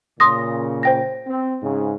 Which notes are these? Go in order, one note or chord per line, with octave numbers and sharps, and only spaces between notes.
A#2 C#3 C6 D#6 A#6
C5 G5 A#6
C4
G#2 C#3